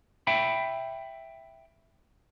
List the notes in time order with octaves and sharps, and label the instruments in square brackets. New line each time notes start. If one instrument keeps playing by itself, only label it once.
[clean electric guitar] E5 G5 B5